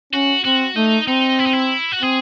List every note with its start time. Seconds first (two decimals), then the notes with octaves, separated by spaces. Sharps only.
0.13 C#4 F#4
0.45 C4 F#4
0.76 A3 D#4
1.08 C4 D#4
1.39 E4
1.46 D#4
1.53 E4
1.92 F#4
2.02 C4 G#4